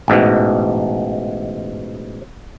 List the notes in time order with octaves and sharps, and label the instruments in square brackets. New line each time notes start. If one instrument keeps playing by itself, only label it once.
[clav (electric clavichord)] A1 G#2 B2